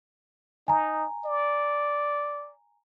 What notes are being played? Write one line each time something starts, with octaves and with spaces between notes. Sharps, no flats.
D#4 G#5 A#5
D5